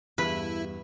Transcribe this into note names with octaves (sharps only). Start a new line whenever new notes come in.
E2 G2 E4 B4